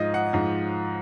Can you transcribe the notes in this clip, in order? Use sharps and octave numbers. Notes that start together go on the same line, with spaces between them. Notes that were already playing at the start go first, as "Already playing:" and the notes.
Already playing: G#2 F3 D#5
F#5
G#2 F3